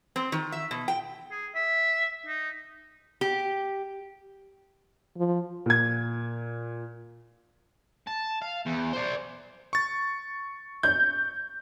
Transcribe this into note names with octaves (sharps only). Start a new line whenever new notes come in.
C4
D#3
E5
B2
G5
G#4
E5
D#4
G4
F3
A#2 G#6
A5
F5
E2
C5 D5
C#6 A6
G6